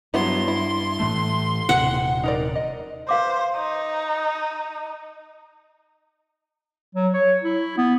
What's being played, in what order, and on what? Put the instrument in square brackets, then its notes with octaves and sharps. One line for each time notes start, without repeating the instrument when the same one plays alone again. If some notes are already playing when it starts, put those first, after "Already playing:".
[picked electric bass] G2 [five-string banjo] F#3 B3 E4 [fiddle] C6
[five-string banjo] E4
[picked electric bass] A2 E3 A3
[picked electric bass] D#1 C3 [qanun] F#5
[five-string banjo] D#4 A#4 D5
D#5
[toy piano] B4 F5 D6 [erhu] C5
[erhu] D#4
[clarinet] F#3
C#5
E4
B3